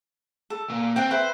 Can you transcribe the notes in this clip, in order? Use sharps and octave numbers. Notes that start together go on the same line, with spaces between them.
A4
A#2
C4 F#5 G5
B4 C5 E5 G5